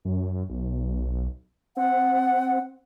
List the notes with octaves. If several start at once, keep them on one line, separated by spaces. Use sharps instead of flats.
F#2
B1
C4 F#5